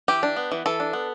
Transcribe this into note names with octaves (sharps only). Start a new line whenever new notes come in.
E3 G4
D4
B3
E3
E3 A4
D4
B3